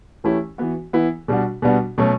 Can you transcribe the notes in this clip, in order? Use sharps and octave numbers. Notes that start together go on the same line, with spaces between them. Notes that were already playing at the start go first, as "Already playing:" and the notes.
E3 A3 C#4 E4 G4
E3 B3 F#4
E3 B3 E4
B2 G3 D4 F#4
B2 G3 B3 D4 F#4
B2 F#3 A3 C#4